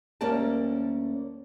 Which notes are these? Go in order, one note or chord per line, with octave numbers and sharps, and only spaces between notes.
D2 G3 A#3 C#4 D5 A5